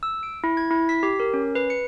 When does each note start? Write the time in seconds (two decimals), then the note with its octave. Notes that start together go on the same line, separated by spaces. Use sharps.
0.03 E6
0.23 D7
0.44 E4
0.57 G#6
0.71 E4
0.89 B6
1.03 G4
1.20 A#4
1.34 C#4
1.55 B4
1.70 C#7